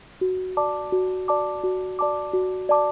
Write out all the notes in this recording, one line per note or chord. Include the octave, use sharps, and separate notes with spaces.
F#4
D5 A5 D6
F#4
D5 A5 D6
F#4
D5 A5 D6
F#4
D5 A5 D6